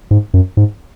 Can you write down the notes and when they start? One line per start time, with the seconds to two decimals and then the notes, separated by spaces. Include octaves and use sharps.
0.11 G#2
0.34 F#2
0.57 G#2